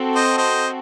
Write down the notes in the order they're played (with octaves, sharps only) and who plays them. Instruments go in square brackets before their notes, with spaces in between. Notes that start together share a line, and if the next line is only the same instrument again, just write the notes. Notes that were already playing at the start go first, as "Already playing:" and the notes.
Already playing: [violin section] C4 F#4 A4
[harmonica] C5 D#5
C5 D#5